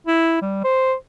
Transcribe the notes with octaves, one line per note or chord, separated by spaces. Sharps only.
E4
G3
C5